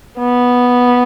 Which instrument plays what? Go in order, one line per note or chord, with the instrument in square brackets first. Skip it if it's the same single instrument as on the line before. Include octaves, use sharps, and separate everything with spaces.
[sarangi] B3